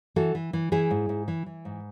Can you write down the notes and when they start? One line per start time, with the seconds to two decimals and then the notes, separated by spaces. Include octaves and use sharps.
0.16 E3 F#4 A4
0.35 E3
0.53 E3
0.72 E3 E4 G#4
0.91 G#2
1.09 G#2
1.28 E3
1.46 E3
1.65 G#2